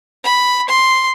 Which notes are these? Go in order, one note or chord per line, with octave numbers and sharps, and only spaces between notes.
B5
C6